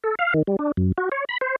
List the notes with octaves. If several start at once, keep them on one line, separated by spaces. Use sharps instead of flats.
A4
F5
D#3
G3
D4
F#2
F#4
C#5
B5
C5